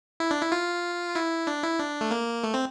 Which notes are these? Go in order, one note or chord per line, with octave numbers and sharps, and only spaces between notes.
E4
D4
E4
F4
E4
D4
E4
D4
A3
A#3
A3
C4